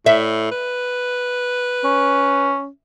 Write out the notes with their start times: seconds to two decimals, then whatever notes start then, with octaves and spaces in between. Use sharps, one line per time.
0.06 A2 E5
0.51 B4
1.84 C#4